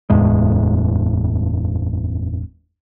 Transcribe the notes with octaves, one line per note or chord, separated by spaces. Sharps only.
F#1 E2 A2 G#3